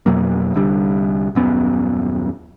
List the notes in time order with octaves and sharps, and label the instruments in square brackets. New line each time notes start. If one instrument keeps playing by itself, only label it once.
[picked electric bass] F2 B2 F#3 A#3
C2 D3 G3
D#1 F#2 B3